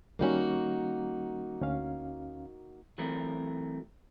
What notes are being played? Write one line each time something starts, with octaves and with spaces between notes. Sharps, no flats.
D#3 G3 A#3 C#4 D#4 F#4
D2 C#4 F5
E3 F#3 A3 C4 A#4